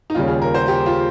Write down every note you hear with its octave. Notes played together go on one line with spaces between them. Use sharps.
D#4
D#2 C#3 G3 F4
G#4
A#4
C5
G4
F4